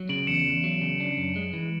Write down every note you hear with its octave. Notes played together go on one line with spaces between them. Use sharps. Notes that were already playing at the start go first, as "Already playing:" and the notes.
Already playing: F#3
C#3 D7 F#7
E2 C#7 E7
E2
F#3
C#3
D4
F#2
G#3
E3